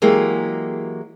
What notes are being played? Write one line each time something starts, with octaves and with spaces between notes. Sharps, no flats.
E3 F#3 G#3 A#3 G4